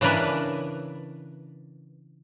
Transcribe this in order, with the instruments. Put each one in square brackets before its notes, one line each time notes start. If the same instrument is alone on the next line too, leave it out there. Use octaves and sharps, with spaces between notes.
[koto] C#3 E3 D4 A#4 B4